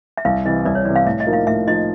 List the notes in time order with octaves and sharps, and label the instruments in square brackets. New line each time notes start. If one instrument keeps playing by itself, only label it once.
[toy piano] E5
[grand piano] C2 [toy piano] F5
[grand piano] C3 E3 [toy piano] D#5
[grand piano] C2 [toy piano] D5
[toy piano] C#5
[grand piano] C3 E3 [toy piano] D5
[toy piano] F5
[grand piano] A2 [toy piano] E5
[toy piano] D#5
[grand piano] F3 A#3 D#4
[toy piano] F5
[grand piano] A2 [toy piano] E5
[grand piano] F3 A#3 D#4 [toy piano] D#5